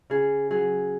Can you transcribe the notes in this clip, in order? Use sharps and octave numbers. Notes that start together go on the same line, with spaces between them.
C#3 G#4
F#3 G#4